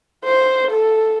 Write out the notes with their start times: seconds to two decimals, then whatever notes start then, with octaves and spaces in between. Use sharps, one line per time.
0.25 C5
0.71 A4